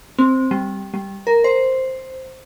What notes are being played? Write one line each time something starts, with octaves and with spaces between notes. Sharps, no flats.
C4
G3
G3
A#4
C5